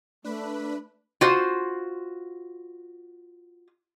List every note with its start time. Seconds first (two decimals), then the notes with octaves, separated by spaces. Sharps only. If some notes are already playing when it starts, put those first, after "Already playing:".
0.24 A3 D4 B4 B5
1.21 F4 F#4 C5